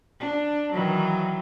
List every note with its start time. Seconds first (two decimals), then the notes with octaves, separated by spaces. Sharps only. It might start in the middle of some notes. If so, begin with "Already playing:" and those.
0.20 D4
0.72 D#3 E3 F#3